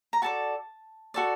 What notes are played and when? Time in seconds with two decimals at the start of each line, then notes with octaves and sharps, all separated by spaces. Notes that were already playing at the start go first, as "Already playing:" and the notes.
0.13 A#5
0.22 F#4 A4 D5 A5
1.14 F#4 A4 D5